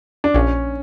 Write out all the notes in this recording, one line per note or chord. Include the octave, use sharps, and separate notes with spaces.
D4
A#1 C#4